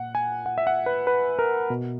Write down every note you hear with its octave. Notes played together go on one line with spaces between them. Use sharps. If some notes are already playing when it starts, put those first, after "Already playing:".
Already playing: A#2 F#5
G#5
F#5
E5
F#5
B4
B4
A#4
B2